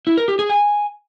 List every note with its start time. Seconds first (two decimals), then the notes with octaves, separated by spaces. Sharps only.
0.07 E4
0.17 A#4
0.28 G4
0.39 G#4
0.49 G#5